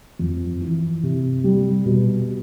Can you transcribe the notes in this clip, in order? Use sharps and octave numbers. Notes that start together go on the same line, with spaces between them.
F2
E3
C3
G3
B2